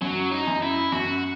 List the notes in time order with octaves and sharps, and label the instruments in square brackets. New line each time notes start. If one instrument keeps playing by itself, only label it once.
[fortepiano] F#2 [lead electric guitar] F#3
[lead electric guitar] D#4
[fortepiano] F#2
[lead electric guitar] E4
[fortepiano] F#2 [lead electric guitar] F#4